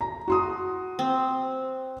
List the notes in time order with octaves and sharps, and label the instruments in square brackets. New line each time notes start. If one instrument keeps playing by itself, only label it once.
[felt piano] A#5
F#4 C6 D#6
[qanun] C4